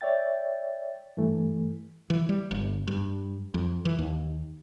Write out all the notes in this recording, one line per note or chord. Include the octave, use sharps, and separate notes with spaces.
C#5 D5 E5 G5 A6
G2 E3 A3
E3
G3
G1
G2
F2
E3
D#2